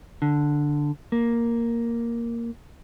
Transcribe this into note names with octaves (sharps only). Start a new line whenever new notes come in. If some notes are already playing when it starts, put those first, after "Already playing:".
D3
A#3